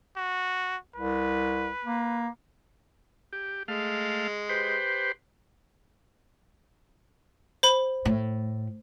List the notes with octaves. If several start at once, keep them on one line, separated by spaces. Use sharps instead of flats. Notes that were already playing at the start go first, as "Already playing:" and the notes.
F#4
C2 B4
A#3
G4
G#3 A3 F5
G4 B4 C5
C5 B5
A2